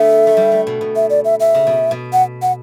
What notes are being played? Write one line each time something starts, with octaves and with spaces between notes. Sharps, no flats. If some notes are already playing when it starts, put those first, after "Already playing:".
Already playing: D3 A3 B3 E5
A3
G3
A3
B2
B2
E5
D5
E5
E5
C#3
B2
B2
F#5
F#5